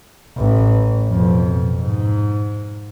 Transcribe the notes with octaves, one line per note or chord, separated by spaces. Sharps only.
A1 E3
F2 B2
G#2